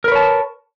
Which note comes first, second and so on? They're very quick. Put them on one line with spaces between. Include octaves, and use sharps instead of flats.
A#4 B4 C#5 A5